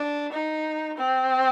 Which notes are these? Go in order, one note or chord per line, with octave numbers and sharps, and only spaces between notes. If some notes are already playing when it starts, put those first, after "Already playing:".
Already playing: D4
D#4
C4